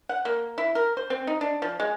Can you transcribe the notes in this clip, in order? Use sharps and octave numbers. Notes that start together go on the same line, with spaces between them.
F#5
A#3
E4
A#4
C5
C4
D#4
D4
F3
G#3